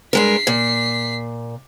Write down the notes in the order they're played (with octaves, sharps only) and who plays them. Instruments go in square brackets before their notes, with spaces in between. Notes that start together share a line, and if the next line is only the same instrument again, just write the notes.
[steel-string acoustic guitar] G2 G#3 A#4 [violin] B6 C7
[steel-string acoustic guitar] A#2